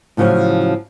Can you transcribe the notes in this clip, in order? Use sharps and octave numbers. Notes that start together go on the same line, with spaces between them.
A2 C#3 F3 F#3 C#4